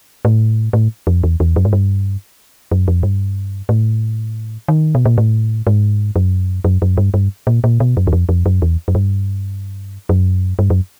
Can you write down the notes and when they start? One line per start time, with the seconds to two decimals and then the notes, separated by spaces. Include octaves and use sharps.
0.25 A2
0.73 A2
1.07 F2
1.24 E2
1.40 E2
1.56 F#2
1.65 G#2
1.73 G2
2.72 F#2
2.88 F2
3.03 G2
3.69 A2
4.68 D#3
4.95 B2
5.05 A#2
5.18 A2
5.67 G#2
6.16 F#2
6.64 F#2
6.82 F#2
6.98 G2
7.14 G2
7.47 A#2
7.64 A#2
7.80 B2
7.97 F#2
8.07 E2
8.13 F2
8.29 F2
8.46 F#2
8.62 E2
8.88 F#2
8.95 G2
10.09 F#2
10.59 G2
10.70 F#2